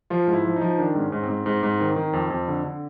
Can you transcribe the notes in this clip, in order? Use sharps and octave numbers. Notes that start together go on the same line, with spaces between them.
F3 F4
G#2
E4
F3
D#4
F3
D#3 D4
G#2 C4
C#4
G#2
C4
G#2
G#2
G#2
D#3
D#3
F2
F2
D3
D3